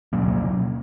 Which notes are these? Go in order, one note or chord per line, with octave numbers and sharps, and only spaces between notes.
B2 F#3 A#3 C#4